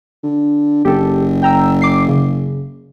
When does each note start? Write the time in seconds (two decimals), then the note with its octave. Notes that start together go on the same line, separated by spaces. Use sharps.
0.23 D3
0.85 F#1 G4 A4
1.43 G5 A#5 E6
1.82 D6 C7
2.08 C#3